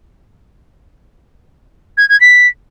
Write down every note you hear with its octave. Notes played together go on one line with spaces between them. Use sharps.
G#6
G#6
B6